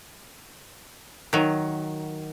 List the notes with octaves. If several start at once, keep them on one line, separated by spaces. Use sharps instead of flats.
D#3 F#3